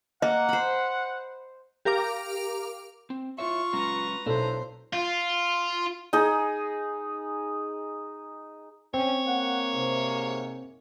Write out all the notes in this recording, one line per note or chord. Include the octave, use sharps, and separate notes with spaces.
A#3 D#5 F#5
C5 B5
G4 A#4 F5 A#5 D6
C4
E4 F4 C#5 E5 C#6
F#3 G#3 C#4 B4 A#5
B1 D4 E4 A4 C5
F4
D#4 G#4
C4 C#4 C#5
A#3 F#5
G#2 C3